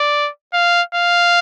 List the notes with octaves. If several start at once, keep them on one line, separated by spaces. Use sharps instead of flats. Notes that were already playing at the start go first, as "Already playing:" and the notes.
Already playing: D5
F5
F5